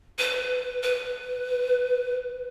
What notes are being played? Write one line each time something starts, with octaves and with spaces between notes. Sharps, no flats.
B4
B4